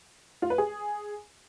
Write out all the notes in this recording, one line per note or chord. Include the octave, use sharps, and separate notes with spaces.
F4
B4
G#4